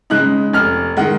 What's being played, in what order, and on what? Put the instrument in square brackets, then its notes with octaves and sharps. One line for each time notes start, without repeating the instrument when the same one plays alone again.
[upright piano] C#3 G#3 D#4 F#6
F1 F6
D#3 G#3 F#5